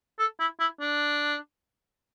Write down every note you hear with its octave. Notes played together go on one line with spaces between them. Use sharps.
A4
E4
E4
D4